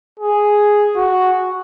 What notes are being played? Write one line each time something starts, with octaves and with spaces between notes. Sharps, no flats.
G#4
F#4